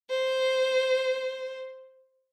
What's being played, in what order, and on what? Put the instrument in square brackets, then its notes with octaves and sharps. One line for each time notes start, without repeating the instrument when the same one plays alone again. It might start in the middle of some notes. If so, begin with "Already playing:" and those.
[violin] C5